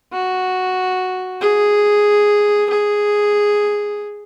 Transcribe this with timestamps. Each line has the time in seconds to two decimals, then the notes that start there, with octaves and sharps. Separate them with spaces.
0.12 F#4
1.41 G#4
2.70 G#4